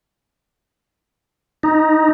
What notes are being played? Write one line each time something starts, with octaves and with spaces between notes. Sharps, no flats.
D#4